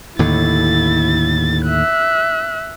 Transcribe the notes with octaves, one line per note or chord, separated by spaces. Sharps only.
D#2 A2 D3 E4 A6
E5 F#6